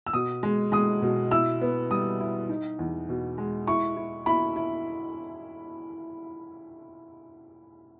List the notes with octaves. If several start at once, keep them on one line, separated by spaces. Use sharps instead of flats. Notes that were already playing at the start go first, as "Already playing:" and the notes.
E6
B2 D#6
G#3
G#3 D#6
B2
E4 E6
B3
G3 D#6
E4
D#4
E2
B2
G#3
E4 C#6
E4
E4 B5
E4